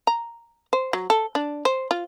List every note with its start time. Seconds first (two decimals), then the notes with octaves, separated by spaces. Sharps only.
0.07 A#5
0.73 C5
0.93 F#3
1.10 A4
1.35 D4
1.65 C5
1.91 F4